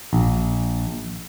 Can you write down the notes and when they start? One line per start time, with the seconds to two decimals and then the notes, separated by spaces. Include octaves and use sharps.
0.13 A#1